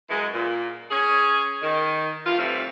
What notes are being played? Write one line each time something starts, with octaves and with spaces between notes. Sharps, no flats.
F#2 E3 G#3
A#2
C#4 G#4
D#3
G2 E3 F4
C3 E3 G3 A3 C4